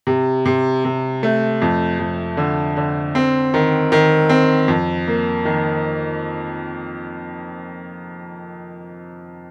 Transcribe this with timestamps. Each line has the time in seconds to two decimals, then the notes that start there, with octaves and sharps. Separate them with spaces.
0.07 C3
0.46 C3
0.85 C3
1.23 A3
1.62 F2
1.99 F2
2.37 D3
2.77 D3
3.15 C4
3.54 D#3
3.92 D#3
4.29 C4
4.68 F2
5.07 A#3
5.45 D#3